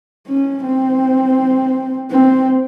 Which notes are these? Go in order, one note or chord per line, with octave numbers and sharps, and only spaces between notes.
C#4
C4
C4